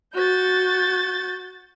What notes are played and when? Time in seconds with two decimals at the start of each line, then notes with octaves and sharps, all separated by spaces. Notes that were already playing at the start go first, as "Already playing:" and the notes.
0.13 F#4 G6 A6